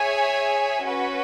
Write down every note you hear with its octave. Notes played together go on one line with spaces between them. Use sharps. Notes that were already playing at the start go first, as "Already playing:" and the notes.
Already playing: G#4 C#5 E5 G#5
C#4 F#4 B4